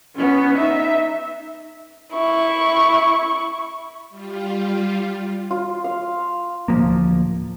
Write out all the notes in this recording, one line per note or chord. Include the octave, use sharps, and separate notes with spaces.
B3 C#4
D#4 E5
E4 C#6
G3 F4
F4
F5
D1 G#1 F3 A#3